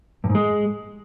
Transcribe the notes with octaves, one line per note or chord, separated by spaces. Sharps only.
G2
G#2
G#3